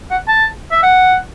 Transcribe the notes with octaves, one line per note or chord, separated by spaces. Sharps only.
F#5
A5
E5
F#5